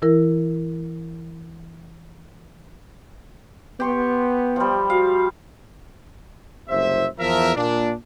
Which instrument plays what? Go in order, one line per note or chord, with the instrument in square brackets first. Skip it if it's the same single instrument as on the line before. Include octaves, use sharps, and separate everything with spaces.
[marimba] E3 E4 A#4
[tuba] B3 [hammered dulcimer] G4 C6 C#6
[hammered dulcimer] F3 G3
[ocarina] F#4 [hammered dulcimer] F5
[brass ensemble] F#1 C2 C3 C5 E5
E2 F3 A#4 E5
A#2 D4